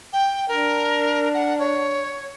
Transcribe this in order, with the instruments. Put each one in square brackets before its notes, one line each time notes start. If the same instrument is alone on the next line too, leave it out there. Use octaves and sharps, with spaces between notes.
[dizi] G5
[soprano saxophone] D4 [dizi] A#4
[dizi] F#5
C#5